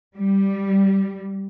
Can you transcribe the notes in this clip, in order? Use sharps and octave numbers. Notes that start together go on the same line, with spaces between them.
G3